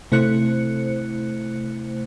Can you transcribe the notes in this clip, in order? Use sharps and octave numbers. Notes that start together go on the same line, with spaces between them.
C3 A3 E4 C5 F#6 C#7